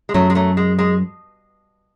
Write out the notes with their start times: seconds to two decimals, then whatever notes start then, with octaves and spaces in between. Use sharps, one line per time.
0.09 G#3
0.14 F#2 F#3 A3
0.30 G#3
0.35 F#3 A3
0.57 G#3
0.79 G#3